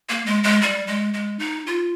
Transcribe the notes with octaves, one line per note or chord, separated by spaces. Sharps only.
A#3
G#3
G#3
G3
G#3
G#3
D#4
F4